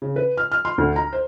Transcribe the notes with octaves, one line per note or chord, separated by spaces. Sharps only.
C#3
B4
F6
F6
C6
D2
A#5
C5